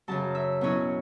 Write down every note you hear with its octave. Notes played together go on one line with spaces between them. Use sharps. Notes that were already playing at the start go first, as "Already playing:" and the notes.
F#2 C#3 F#3 A5
E5
B2 F#3 C#4 E4 C#5